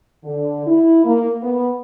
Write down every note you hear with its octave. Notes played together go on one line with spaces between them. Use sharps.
D3
E4
A#3
B3